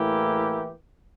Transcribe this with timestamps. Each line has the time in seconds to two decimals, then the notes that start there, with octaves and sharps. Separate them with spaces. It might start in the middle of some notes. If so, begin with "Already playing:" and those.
Already playing: A2 E3 A#3 E4 G4